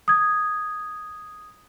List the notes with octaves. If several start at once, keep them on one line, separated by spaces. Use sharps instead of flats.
D#6 G#6